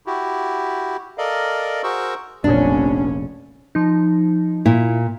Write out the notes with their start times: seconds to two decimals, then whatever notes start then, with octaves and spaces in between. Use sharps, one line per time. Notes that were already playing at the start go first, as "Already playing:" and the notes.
0.06 E4 F#4 G4
1.18 A4 A#4 D5 D#5 F5
1.83 F#4 G#4 A#4 C5 C#6 E6
2.44 F1 A#1 C#4 D4
3.75 F3 D#4
4.66 A#2 E4